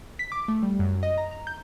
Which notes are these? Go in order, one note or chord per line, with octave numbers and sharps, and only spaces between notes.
B6
D6
A3
G3
F#2
D#5
A#5
A#5
G6